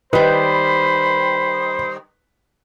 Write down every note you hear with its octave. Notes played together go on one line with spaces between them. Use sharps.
D#3 G3 B4 C5 B5